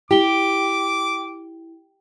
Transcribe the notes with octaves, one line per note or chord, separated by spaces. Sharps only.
E4 G4 D6 G7